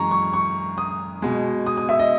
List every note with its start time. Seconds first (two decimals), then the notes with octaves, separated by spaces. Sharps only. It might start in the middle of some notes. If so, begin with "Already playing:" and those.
Already playing: F#2 E3 G#3 A#5 C#6
0.11 C#6
0.34 C#6
0.78 D#6
1.22 B2 G#3
1.66 D#6
1.77 D#6
1.89 E5
1.99 D#5